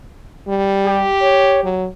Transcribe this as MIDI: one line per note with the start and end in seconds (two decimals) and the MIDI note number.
0.48 1.06 55
0.86 1.74 67
1.21 1.59 73
1.63 1.87 54